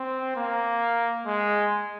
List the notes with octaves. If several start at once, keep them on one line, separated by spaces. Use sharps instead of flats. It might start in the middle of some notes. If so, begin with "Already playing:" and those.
Already playing: C4
A#3
G#3